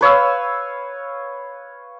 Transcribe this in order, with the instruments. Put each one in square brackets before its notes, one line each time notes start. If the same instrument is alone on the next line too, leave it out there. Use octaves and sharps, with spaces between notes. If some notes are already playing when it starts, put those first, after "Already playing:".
[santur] B4 C#5 F5 E6